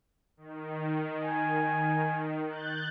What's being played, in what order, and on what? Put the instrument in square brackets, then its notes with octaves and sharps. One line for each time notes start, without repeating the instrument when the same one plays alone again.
[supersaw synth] D#3
[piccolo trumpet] G#5
[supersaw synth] F#6 G6 A6